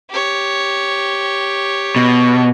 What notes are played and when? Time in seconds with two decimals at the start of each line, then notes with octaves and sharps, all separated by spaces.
0.10 G4 C#5
1.96 B2